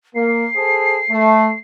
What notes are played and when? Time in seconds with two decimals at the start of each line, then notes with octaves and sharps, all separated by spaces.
0.15 A#3 C7
0.56 G#4 A4 C5
1.11 A3